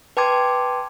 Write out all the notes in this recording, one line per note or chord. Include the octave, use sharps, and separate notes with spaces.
B4 G5 A5 C6 D6 G#6